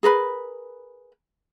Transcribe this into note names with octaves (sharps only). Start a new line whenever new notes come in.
G#4 A#4 B4 B5